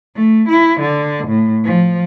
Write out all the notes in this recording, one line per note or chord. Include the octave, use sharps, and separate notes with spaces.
A3
E4
D3
A2
F3